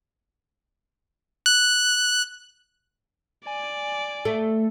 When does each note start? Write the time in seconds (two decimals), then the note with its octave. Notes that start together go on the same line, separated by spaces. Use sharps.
1.46 F#6
3.47 D5 G#5
4.25 A3 A4